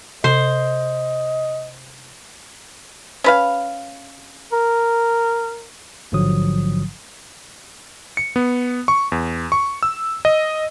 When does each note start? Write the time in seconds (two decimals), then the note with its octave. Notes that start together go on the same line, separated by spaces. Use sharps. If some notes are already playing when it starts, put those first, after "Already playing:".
0.24 C3 C5 D#5
3.24 C#4 B4 F5
4.53 A#4
6.12 A1 G#2 D3 F3 F#3 D#6
8.17 C#7
8.36 B3
8.88 C#6
9.12 E2
9.52 C#6
9.83 E6
10.25 D#5